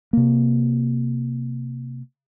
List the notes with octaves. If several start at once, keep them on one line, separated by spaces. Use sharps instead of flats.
C3 A#3